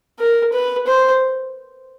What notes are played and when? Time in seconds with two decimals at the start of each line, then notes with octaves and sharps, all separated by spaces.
0.19 A#4
0.53 B4
0.87 C5